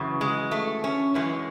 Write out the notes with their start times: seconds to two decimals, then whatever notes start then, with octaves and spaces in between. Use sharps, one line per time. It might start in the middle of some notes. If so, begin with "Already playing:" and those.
Already playing: F#2 C#3 E3
0.21 G#3
0.51 A3
0.84 C#4
1.15 F#2 E3 G#3 C#4